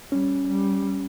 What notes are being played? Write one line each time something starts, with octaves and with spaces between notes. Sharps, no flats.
G3 C#4
G3